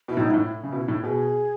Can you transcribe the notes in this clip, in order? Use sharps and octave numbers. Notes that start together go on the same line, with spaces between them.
B2 E4
A2
D#4
G#2
A2 E4
C#3
B2
A2
B2 G#4